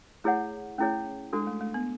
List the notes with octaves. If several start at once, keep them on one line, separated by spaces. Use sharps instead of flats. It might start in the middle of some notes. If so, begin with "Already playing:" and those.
A3 E4 G#4 C#5 F#5
A3 C#4 E4 G#4 C#5
G#3 D4 F#4 A4
A3
A3
B3